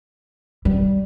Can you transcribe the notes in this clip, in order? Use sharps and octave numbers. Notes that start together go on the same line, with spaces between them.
G3